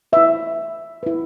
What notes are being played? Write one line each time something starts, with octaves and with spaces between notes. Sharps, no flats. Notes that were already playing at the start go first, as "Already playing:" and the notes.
E4 B4 E5
E4 B4